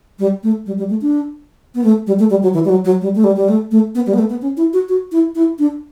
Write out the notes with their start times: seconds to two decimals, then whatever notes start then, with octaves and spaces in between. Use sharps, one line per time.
0.19 G3
0.43 A3
0.66 G3
0.78 G3
0.90 A3
1.01 D4
1.75 B3
1.84 A3
2.07 G3
2.19 A3
2.30 G3
2.43 F#3
2.54 E3
2.65 G3
2.69 F#3
2.85 F#3
3.01 G3
3.15 A3
3.24 G3
3.36 G3
3.48 A3
3.71 A3
3.95 B3
4.06 G3
4.14 B3
4.18 A3
4.30 B3
4.42 C#4
4.57 E4
4.73 F#4
4.89 F#4
5.12 E4
5.35 E4
5.59 D4